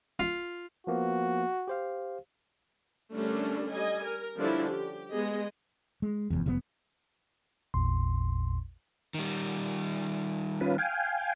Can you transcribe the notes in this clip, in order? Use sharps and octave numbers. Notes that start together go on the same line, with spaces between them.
F4
F3 A#3 B3 F#4
G4 C5 F5
D3 G3 A3 C#4 D4 A#4
G3 D#5 G#5
A#4
D3 F3 G3 C#4 D4 E4
G4
G#3 B3 G#4 D#5
G#3
F1 E2
F1 B2 B3
A1 E2 A#2 C6
D#3 G3
C#4 F4 B4
F5 G5 G#5